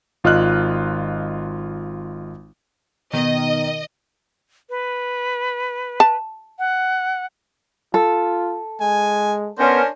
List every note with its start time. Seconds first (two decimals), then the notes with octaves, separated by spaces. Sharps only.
0.24 G#1 F4 D#5 F6 F#6
3.13 B2 D#3 D#5
4.69 B4
6.00 A5
6.59 F#5
7.94 F4 A4
8.81 G#3 G#5
9.59 B3 C#4 D4 A#4 C5